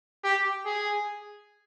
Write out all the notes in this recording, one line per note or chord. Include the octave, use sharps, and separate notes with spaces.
G4
G#4